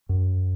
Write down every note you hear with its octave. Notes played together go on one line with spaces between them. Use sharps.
F#2